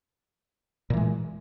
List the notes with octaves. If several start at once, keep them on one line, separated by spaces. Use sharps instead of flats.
A#2 E3 G#3